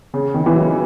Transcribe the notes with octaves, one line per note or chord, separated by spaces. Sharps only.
C#3
D#3
E3
F#3